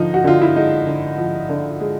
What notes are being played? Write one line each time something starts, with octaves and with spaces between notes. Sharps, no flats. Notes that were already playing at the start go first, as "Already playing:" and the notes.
Already playing: D3 F3 D#4
F#4
D3 F4
E4
G#3 D#4
D3
F3
D3
G#3